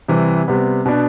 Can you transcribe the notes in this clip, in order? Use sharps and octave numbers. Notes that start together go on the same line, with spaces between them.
C3 E3 G3
C3 G3 B3
B2 B3 D4